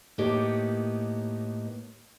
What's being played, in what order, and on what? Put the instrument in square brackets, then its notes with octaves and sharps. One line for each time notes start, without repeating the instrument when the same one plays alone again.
[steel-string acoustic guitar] A2 A#3 B3 D#4 G4 C#5